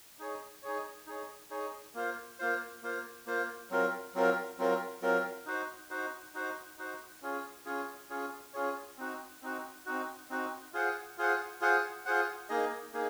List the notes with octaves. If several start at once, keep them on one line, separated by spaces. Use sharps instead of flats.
D#4 G#4 C#5
D#4 G#4 C#5
D#4 G#4 C#5
D#4 G#4 C#5
A#3 F4 C5
A#3 F4 C5
A#3 F4 C5
A#3 F4 C5
F#3 C4 F4 A#4
F#3 C4 F4 A#4
F#3 C4 F4 A#4
F#3 C4 F4 A#4
D#4 F#4 C5
D#4 F#4 C5
D#4 F#4 C5
D#4 F#4 C5
C#4 F4 G#4 C#5
C#4 F4 G#4 C#5
C#4 F4 G#4 C#5
C#4 F4 G#4 C#5
C4 D#4 F#4
C4 D#4 F#4
C4 D#4 F#4
C4 D#4 F#4
F4 G#4 C5 F#5
F4 G#4 C5 F#5
F4 G#4 C5 F#5
F4 G#4 C5 F#5
A#3 D#4 G#4 D#5
A#3 D#4 G#4